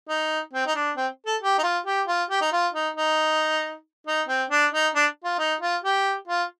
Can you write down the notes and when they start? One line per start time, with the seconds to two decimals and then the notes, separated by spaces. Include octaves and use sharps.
0.09 D#4
0.53 C4
0.67 D#4
0.75 D4
0.97 C4
1.26 A4
1.42 G4
1.58 D#4
1.63 F4
1.86 G4
2.08 F4
2.30 G4
2.41 D#4
2.52 F4
2.74 D#4
2.96 D#4
4.07 D#4
4.28 C4
4.50 D4
4.73 D#4
4.95 D4
5.24 F4
5.39 D#4
5.61 F4
5.84 G4
6.28 F4